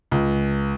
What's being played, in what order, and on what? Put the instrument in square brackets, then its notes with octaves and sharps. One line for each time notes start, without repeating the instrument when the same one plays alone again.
[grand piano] C#2